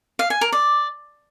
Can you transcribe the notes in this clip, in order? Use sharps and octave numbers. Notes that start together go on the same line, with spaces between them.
F5
G#5
A#4
D5